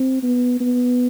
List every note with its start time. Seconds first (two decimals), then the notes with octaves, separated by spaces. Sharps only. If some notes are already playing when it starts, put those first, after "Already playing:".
Already playing: C4
0.23 B3
0.61 B3